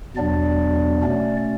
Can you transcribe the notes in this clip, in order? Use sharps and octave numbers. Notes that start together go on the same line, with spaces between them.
E2 B2 F#3 B3 D4 D5
B2 A3 C#4